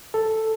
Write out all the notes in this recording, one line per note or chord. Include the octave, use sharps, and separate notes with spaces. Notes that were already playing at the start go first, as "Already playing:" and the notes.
A4